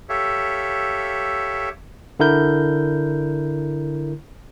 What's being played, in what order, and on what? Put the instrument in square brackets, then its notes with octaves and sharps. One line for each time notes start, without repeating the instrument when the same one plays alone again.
[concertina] G4 A4 C#5 E5 F5
[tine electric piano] D3 E4 A#4 G6